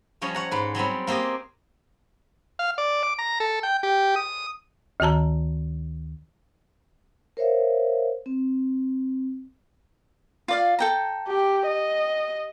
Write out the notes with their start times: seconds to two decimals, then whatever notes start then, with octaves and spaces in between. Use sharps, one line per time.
0.21 F3 G3 C#4 C#5 D#5
0.35 C#5 F#5 A#5
0.51 G#2 B4
0.75 F#3 G3 B3 C4
1.07 A#3 C4 G4 G#4 D#5
2.59 F5
2.78 D5
3.03 D6
3.19 A#5
3.40 A4
3.63 G5
3.83 G4
4.16 D#6
5.00 D2 D#3 F#4 A5 A#5
7.37 A#4 C5 C#5 E5 F5
8.26 C4
10.48 F4 D5 F5
10.79 A4 G5 A#5
11.28 G4
11.66 D#5